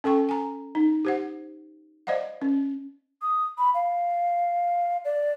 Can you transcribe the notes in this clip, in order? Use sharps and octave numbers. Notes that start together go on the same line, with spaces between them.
C#4 A4 G5 C#6
G#5 A#5
D#4
G4 C5 F#5
C5 D5 D#5 F5 F#5
C#4
D#6
B5
F5
D5